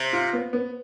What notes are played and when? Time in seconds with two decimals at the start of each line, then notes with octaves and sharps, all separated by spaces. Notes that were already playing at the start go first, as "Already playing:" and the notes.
Already playing: C3
0.13 F4
0.33 B3
0.53 B3